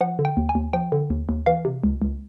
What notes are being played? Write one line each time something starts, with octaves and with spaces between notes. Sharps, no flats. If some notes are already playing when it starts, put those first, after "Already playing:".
F3 F#5
D3
G5
D#2
G#5
D#2
F3 G5
D3
D#2
D#2
E3 F5
C3
C#2
C#2